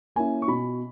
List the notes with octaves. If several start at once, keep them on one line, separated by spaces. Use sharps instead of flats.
A#3 C#4 E4 G#5
C#6
B2 B5